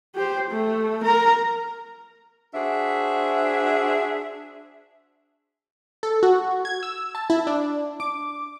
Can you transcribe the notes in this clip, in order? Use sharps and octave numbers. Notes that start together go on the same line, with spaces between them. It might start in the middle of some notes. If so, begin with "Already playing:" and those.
G4 C5
A3
A#4 A#5
D4 F#4 G#4 C5 E5
A4
F#4
G#6
E6
A5
E4
D4
D6